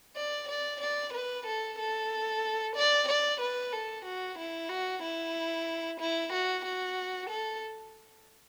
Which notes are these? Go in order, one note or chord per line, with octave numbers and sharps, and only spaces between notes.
D5
D5
D5
B4
A4
A4
D5
D5
B4
A4
F#4
E4
F#4
E4
E4
F#4
F#4
A4